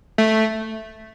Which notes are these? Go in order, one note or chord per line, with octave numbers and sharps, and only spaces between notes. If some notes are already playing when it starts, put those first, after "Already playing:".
A3